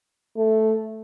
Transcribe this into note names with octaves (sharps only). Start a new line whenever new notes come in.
A3